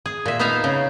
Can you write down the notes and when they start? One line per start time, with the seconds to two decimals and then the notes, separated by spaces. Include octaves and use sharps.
0.06 G#4
0.26 A#2 E5
0.39 B3 D#4 E5 F5 A#5
0.64 C#3